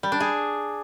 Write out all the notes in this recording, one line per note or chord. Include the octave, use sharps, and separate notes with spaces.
G3
D4
G#4